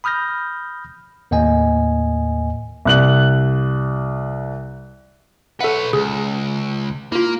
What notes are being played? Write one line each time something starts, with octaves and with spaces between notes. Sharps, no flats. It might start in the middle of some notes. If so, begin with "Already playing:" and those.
B5 D#6 F6 G6 A#6
D#2 A2 A#3 D#5 G#5
C2 F#6 F#7
A4 B4 C#5 E5 F#5
C#2 G#4
A#3 E4 F4